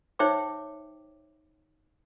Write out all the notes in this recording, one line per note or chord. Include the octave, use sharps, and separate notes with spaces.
D#4 C5 C#5 E5 G5 D6